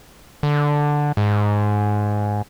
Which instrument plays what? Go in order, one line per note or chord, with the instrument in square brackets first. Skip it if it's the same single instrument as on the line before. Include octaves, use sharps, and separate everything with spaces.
[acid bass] D3
G#2